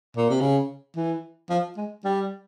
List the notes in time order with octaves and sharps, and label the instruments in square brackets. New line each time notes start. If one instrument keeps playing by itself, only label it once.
[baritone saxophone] A#2
C3
C#3
E3
F3
G#3
G3